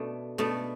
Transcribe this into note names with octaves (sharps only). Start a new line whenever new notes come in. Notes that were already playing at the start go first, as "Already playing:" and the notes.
Already playing: B2 A3 D4
B2 A3 D4